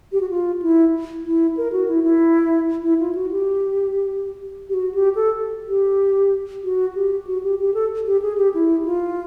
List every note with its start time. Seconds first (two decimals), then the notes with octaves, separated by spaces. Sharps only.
0.12 G4
0.21 F#4
0.30 F4
0.62 E4
1.25 E4
1.57 A#4
1.72 F#4
1.88 E4
2.04 E4
2.83 E4
3.00 F4
3.15 F#4
3.31 G4
4.69 G4
4.74 F#4
4.94 G4
5.15 A4
5.68 G4
6.64 F#4
6.95 G4
7.27 F#4
7.43 G4
7.60 G4
7.74 A4
8.06 G4
8.22 G#4
8.38 G4
8.54 E4
8.85 F4